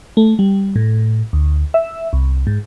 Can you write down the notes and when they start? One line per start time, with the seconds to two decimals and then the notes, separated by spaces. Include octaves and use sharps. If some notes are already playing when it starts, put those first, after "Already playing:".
0.17 A3
0.39 G3
0.76 A2
1.33 D2
1.74 E5
2.13 C2
2.47 G#2